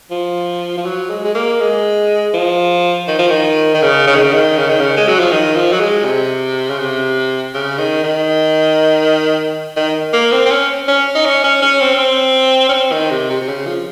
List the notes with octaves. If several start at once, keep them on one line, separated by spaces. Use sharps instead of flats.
F3
F3
F#3
G#3
G#3
A#3
G#3
F3
D#3
F3
D#3
D#3
C#3
C#3
D#3
C#3
D#3
C#3
D#3
C#3
G#3
F#3
F3
D#3
F3
F#3
G#3
C3
C#3
C3
C#3
D#3
D#3
D#3
A#3
C4
C4
C#4
C#4
D#4
C#4
C#4
C#4
C4
C#4
C4
C#4
C4
D#3
C3
C3
C3
C#3
F3